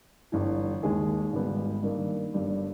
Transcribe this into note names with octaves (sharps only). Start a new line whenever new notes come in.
G1 G2 E3
D#2 D#3 G#3 D#4 G#4
G#1 G#2 D#3 G3 B3
G2 D#3 A#3
G1 G2 G3